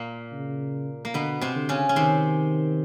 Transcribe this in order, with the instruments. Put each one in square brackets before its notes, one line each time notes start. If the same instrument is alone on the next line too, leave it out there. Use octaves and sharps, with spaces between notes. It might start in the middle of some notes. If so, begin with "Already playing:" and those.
Already playing: [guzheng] A#2 A#3
[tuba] C#3
[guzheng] A#3
[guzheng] B2 B3 [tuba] D3
[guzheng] C3 C4
[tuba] D3
[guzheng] C#3 C#4
C#4
[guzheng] C3 C4 [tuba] D#3